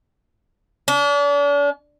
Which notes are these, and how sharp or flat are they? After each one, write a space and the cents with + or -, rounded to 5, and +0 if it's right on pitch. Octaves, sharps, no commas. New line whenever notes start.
D4 -40